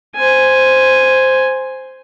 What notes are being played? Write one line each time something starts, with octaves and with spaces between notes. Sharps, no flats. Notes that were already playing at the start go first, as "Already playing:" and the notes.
C5 G#5